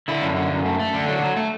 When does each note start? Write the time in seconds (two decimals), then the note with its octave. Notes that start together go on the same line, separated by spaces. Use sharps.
0.08 D3 E4
0.22 F#2
0.36 D3
0.51 F#2
0.65 A3
0.79 A3
0.94 D3
1.08 F#3
1.22 F#3
1.37 A3